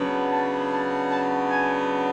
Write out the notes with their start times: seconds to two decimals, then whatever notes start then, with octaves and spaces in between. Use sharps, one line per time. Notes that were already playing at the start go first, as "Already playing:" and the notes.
Already playing: C#3 F#3 B3 D4
0.30 A5
0.70 A5
1.10 A5
1.49 G#5